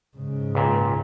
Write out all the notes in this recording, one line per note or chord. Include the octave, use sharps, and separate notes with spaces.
G#2 C#3
C#2 A#2